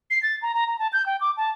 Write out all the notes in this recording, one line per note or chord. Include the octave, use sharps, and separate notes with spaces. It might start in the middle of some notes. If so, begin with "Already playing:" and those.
C7
A6
A#5
A#5
A#5
A5
G6
G5
D6
A5